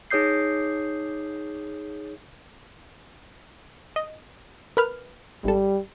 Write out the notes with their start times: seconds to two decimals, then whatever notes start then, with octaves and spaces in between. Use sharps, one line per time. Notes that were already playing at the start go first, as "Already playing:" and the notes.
0.11 D#4 G#4 C#5 D#6 G6 C7
3.96 D#5
4.77 A#4 B4 F6
5.44 G#1 G3 A4